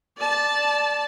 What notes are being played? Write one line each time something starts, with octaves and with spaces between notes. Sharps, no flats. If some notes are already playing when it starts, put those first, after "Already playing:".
D5 A5